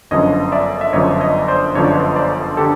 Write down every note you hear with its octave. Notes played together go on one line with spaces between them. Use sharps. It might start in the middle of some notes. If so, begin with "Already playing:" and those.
G1 F#2 D3 F3 C#5 D#5
D5 E5
E5
G1 F#2 D3 F3 C#5 D#5
C#5 D#5
C5 D5
G1 F#2 D3 F3 C#5
D5
B4 C#5
C5 D5
D3 G4 A4